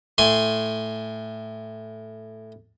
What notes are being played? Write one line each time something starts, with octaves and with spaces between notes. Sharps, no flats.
A2 G#5 C6